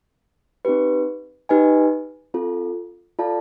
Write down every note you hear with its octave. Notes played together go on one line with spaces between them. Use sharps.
C4 D#4 G4 B4
D#4 G4 B4 D#5 G#5
C4 F4 A4
F4 A4 D5 F5 A5